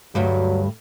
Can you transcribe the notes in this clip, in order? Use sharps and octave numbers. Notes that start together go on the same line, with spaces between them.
D2 G2 F#3 G3